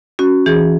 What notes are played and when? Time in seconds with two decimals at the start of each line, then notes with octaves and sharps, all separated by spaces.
0.19 C#4 F#4
0.46 E3 G#4